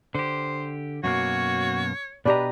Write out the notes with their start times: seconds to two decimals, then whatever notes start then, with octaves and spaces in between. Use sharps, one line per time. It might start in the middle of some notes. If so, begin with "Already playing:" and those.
0.15 D3 G4 C5
1.04 F#2 B2 A#3 F#4 C#5
2.26 B2 D4 G4 B4 D#5 A#5